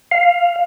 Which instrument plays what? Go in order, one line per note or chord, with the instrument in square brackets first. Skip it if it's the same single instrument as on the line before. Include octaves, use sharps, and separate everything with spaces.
[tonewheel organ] F5